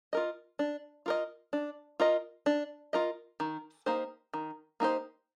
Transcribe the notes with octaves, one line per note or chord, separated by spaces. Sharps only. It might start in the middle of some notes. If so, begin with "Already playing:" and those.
F4 A#4 D#5
D4
F4 A#4 D#5
D4
F4 A#4 D#5
D4
F4 A#4 D#5
D#3
A#3 D#4 G4 C5
D#3
A#3 D#4 G4 C5